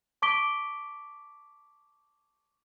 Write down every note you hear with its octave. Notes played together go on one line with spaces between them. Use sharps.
A5 C#6 D6 B6 D7 G7